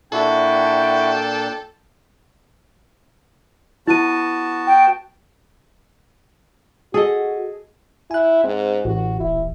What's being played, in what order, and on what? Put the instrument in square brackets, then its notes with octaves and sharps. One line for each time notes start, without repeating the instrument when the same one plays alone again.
[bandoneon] A#2 D4 [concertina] E4 F#4 [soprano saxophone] A4 [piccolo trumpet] G5
[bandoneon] B3 F#4 A5 [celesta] E4 D#7
[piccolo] G5
[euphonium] F#4 [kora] G#4 A4 D#5
[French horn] E4 [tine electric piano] G#5 F#6
[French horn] G#2 [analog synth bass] C4
[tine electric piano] A1 [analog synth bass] A2 [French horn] F#4
[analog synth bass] D#1 [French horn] E4